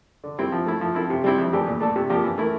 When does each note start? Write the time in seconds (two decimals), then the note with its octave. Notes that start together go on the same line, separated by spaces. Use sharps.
0.24 D3
0.39 G3 C4 E4
0.52 F3
0.66 A3 E4
0.81 F3
0.95 C4 E4 A4
1.10 C3
1.24 G3 C4 E4
1.38 F2
1.53 E3 A3 D4 G4
1.67 A#2
1.80 A3 D4 A4
1.96 C3
2.10 F3 A#3 D4 G4
2.24 E3
2.38 A3 E4 A#4